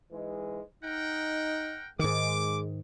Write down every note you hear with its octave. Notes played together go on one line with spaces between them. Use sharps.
G#2 E3 G#3
D#4 A#4 F#5 G5
G#2 D#3 G#3 D6